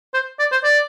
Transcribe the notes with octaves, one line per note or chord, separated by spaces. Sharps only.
C5
D5
C5
D5